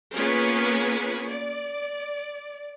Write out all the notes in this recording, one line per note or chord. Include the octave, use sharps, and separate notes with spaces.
A#3 B3 C#4 F4 G#4 B4
D5